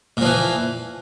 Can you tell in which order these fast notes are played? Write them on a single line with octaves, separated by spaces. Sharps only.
A#2 F3 E3